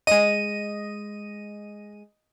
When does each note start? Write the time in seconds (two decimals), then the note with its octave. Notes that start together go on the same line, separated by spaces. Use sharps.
0.07 G#3 D#5 D#7